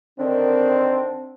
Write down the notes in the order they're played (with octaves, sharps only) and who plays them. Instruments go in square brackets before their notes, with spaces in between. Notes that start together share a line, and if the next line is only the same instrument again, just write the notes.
[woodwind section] D3 D#3 D4 [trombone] C4